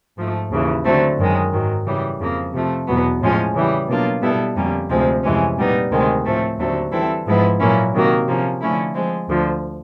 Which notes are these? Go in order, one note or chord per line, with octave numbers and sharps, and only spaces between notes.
G#2 F3 A3
D#2 C#3 E3
D3 F#3 A3 C4
F#2 D#3 G#3
G#2 D#3 F#3
C#3 E3 G3
F2 C#3 F3 A#3
C3 F3 A3
E2 B2 F#3 B3
A2 F3 G#3 C#4
C#3 E3 G3
B2 F#3 A#3 D4 F4
B2 G3 B3 E4 A4
F2 D3 G3 A#3 C#4
D2 C3 F3 G#3 C4
F2 C3 E3 G#3 C#4
A#2 G3 B3 D#4
D2 C3 D#3 G#3 C4
A2 F3 A3 C4
D#2 D3 F#3 A3 C4
E3 G3 C4 E4 A4
G#2 F3 G#3 B3 E4
A#2 F#3 A#3 C#4 E4
C3 D#3 F#3 A#3
C3 F3 A#3 C#4
D3 F3 A3 C#4 E4
F3 G#3 C4
D2 D3 F3